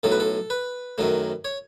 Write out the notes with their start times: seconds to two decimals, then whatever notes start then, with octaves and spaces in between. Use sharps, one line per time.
0.03 B1 A2 F#3 A4
0.12 B4
0.20 A4
0.50 B4
0.98 F#2 D#3 F#3 A3
1.45 C#5